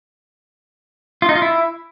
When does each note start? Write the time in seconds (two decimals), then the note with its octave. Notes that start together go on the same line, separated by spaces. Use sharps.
1.22 F4
1.29 D#4
1.35 F4
1.42 E4